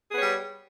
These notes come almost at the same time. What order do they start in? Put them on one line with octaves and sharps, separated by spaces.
G#4 B3 C#5 G3